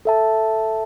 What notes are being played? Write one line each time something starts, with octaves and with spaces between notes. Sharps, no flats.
A4 E5 A5